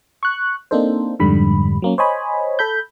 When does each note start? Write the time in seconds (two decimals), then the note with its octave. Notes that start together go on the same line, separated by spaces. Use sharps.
0.23 C#6 F#6
0.71 A#3 C4 D4 D#4 A4 C5
1.19 F2 G#2 D3 G3 B5
1.82 F#3 A#3 C#4
1.98 C5 C#5 D#5 G#5 B5
2.59 A4 B5 G6